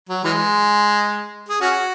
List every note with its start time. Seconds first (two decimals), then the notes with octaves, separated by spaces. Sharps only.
0.09 F#3
0.24 E3 G#3
1.48 G#4
1.61 C#4 F#4